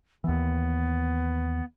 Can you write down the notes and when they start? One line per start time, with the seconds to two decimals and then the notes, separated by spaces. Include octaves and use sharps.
0.24 D#2 E3 B3